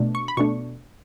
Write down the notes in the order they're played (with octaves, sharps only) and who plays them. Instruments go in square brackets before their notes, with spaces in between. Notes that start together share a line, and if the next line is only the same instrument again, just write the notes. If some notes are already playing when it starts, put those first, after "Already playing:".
Already playing: [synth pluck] B2 A3 D4
C#6
B5
B2 A3 D4 C#6